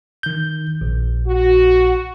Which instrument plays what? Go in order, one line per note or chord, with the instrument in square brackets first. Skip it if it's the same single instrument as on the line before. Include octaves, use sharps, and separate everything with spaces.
[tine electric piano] D#3 G6
A#1
[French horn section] F#4